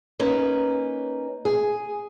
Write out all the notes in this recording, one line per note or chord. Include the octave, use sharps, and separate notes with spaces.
A#3 C#4 D#4 B4
G#4